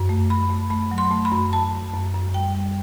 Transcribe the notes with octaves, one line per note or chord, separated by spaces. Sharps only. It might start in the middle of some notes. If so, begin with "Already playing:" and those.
Already playing: F#2
A3
F#2 B5
A3
A3 B5
F#3
C6
A3
B5
F#2
F#2 A5
F#2
F#2
F#2
G3 G5
G3